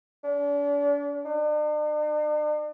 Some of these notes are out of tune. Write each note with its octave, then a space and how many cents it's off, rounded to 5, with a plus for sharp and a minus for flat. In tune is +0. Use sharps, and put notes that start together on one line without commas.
D4 -40
D4 +45